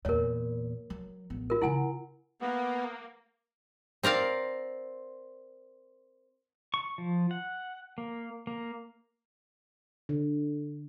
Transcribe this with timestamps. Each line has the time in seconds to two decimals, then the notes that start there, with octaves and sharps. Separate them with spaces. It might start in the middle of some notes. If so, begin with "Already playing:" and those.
0.05 E2 A#2 A#4 C#5
0.90 F#3
1.30 A1 B3
1.50 F4 A#4
1.62 C#3 E3 E4 F#5 G#5
2.41 A#3 B3
4.03 C4 A#4 D5 F5
6.74 C#6
6.98 F3
7.31 F#5
7.98 A#3
8.47 A#3
10.09 D3